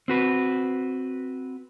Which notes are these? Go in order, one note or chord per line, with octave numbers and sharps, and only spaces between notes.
C4 F#4 B4